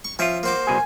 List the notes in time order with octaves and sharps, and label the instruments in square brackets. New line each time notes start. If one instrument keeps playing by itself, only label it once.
[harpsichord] C#6
[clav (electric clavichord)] F3 F4 [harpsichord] C#4 E5
[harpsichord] A#3 F#4 D6 [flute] C5
[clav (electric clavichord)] C2 B2 G#4 [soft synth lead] G#5